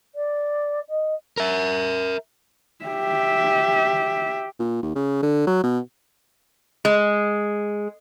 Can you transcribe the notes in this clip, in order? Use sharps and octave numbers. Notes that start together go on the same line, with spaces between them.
D5
D#5
A#4 E5
G4 E5
A#2
D#2
C#3
D3
F#3
B2
G#3